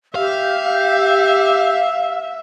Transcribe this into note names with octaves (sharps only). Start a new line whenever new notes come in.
G4 E5 F5